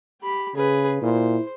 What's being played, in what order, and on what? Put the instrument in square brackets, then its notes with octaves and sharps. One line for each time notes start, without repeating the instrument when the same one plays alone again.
[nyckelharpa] G4 B5
[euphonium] C#3 [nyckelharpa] G#4 B4
[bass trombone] A#2 [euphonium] E4 [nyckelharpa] C5